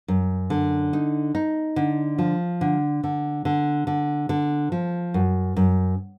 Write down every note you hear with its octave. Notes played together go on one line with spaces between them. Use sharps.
F#2
D3
D#4
D#4
D3
F3
D3
D3
D3
D3
D3
F3
F#2
F#2